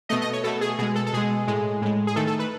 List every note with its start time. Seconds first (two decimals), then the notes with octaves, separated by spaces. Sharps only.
0.09 B2 A3 D#5
0.22 D#5
0.33 C#5
0.44 B2 A3 A4
0.61 G#4
0.78 B2 G#3 G#4
0.95 A4
1.06 A4
1.13 B2 G#3 G#4
1.47 A2 G#3
1.82 A2 G#3
2.07 G#4
2.16 D#3 A3 A4
2.27 A4
2.39 B4